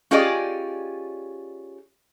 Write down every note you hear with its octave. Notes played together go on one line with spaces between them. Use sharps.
C#4 F4 G4 G#4 D5 D#5